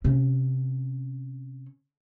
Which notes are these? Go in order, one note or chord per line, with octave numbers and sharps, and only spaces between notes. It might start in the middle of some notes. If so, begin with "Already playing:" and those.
C3 C#4